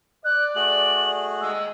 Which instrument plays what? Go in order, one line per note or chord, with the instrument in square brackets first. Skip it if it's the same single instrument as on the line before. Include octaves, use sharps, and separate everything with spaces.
[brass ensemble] D5 [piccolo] F#6
[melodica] A3 F#4 G#4 [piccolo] F#7
[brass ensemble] D#2 G#3 [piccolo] E6